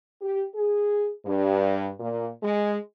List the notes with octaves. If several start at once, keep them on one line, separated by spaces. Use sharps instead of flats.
G4
G#4
G2
A#2
G#3